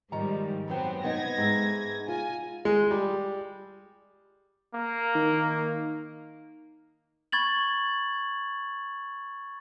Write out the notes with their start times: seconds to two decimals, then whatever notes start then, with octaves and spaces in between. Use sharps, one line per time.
0.12 G#2 D#3 F3 G3 A#5
0.68 F#2 F#3 B3 C4 G5
1.04 B3 D#4 C5 G#6 A#6
1.37 G#2 E5
2.08 F4 G#5
2.65 G#3
2.91 G3
4.74 A#3
5.15 D#3
7.32 B5 C#6 G#6 A6 F#7